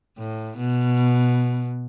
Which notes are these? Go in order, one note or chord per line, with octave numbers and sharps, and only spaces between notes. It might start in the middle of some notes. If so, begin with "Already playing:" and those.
A2
B2